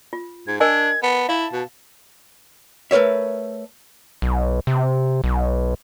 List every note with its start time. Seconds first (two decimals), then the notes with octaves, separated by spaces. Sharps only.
0.13 F4
0.47 G#2 G#6
0.60 D4 A#4 D#5 G#5 G#6
1.03 B3 A5
1.29 E4 F5
1.53 B2
2.91 A3 A#4 B4 C#5 E5
4.22 B1
4.67 C3
5.24 B1